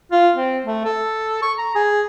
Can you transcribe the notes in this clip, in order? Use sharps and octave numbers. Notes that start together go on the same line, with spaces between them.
F4
C4
A3
A4
C#6
A#5
G#4